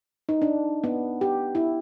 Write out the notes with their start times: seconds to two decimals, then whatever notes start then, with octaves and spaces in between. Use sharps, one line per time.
0.29 D#4
0.42 D4
0.84 B3
1.21 G4
1.55 E4